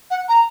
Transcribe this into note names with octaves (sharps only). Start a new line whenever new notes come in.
F#5
A#5